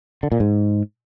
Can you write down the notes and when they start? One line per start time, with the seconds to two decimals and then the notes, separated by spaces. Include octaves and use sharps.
0.23 D3
0.32 A#2
0.40 G#2